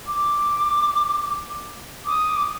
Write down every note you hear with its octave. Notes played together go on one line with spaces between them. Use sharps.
D6
D6 D#6